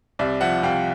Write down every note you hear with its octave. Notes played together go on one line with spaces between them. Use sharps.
C2 D5 E5
F3 E5 F#5
C2 F5 G5